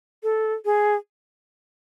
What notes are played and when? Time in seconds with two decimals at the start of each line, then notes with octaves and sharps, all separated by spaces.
0.23 A4
0.65 G#4